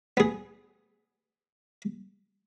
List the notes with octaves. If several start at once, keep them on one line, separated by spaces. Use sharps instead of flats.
B3 G#4